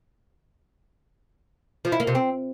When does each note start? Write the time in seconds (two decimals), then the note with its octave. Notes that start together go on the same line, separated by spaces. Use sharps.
1.85 F3
1.92 E4
2.00 A#3
2.07 C3
2.15 C4